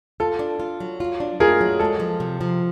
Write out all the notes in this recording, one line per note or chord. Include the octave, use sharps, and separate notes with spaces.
F4 A4
D4
F4
F#3
F4
D4
F4 G#4 A#4
F#3
G#3 A4
F3
C3
F3